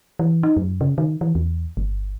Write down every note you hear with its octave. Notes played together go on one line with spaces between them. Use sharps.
E3
D#4
F#2
C#3
D#3
E3
E2
G1